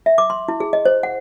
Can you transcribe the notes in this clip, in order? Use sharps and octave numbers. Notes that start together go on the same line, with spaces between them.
E5
D6
C6
E4
G#4
D#5
C5
F#5